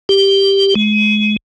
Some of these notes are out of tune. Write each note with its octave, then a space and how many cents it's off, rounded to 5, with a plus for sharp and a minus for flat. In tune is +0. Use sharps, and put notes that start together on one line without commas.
G4 +5
G#3 +30